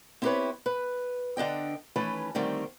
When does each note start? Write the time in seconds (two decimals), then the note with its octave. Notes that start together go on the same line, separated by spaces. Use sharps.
0.22 C4 E4 G4 A#4 B4 C#5
0.66 B4
1.37 D3 D4 D#5 G5
1.96 D#3 E3 A3 C#4 A4 B4
2.35 D3 D#3 G3 A3 C4